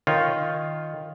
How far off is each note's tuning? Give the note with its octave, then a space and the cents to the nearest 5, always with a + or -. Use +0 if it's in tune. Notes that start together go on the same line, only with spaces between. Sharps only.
D#3 +0 F4 +0 C#5 +0